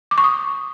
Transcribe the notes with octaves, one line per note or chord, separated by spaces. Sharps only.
D6
C#6
D#6